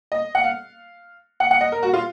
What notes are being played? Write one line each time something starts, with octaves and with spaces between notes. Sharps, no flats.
D#5
F#5
F5
F#5
F#5
D#5
A#4
F#4
F4